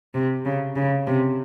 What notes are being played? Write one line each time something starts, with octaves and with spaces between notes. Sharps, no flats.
C3
C#3
C#3
C3